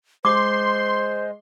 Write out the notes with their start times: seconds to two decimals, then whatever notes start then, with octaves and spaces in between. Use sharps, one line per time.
0.25 G#3 C5 C6 D6